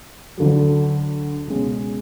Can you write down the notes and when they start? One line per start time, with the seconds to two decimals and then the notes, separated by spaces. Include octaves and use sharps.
0.38 D2 D3 F#3
1.48 C#2 B2 G#3 C#4